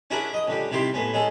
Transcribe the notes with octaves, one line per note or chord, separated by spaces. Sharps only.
C#4 D4 E4 F#4 G#4 A#4
D#5 D#6
C#2 D3 G3
C3 D#3 E4 G4 C6
A2 B3 C#4
G#3 C#4 G#4 A4